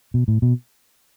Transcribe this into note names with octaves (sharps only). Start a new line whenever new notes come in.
B2
A2
B2